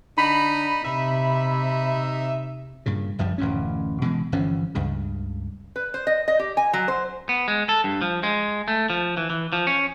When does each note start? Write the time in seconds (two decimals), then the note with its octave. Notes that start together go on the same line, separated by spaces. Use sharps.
0.18 D3 D#4 B5
0.84 C3 D#4 E5
2.86 G2 A#2 C#3
3.19 F#1 F#2 F3 G3
3.38 D1 A1 F#2 C#4
4.02 B2 E3 G#3
4.32 G1 E3 F3 C#4
4.75 C#2 G2 C#3
5.76 B4
5.94 C5
6.07 D#5
6.28 D#5
6.39 G4
6.57 G#5
6.73 F#3
6.88 C5
7.29 B3
7.48 G#3
7.69 A4
7.84 G2
8.02 F3
8.23 G#3
8.68 A3
8.90 F3
9.17 E3
9.30 E3
9.53 F3
9.67 C#4